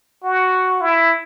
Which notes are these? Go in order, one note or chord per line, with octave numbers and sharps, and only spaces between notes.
F#4
E4